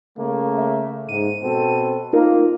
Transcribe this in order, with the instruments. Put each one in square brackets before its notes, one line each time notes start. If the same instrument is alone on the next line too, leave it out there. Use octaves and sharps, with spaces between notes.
[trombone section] C#3 A3 A#3
[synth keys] E5
[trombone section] G#2 [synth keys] D#7
[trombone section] B2 C4 A4
[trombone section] A#3 [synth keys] D#4 F4 A#4